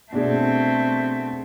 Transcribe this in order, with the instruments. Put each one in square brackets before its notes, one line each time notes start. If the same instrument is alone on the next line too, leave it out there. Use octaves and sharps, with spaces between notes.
[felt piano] B2 D4 G#4 [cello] A3 C4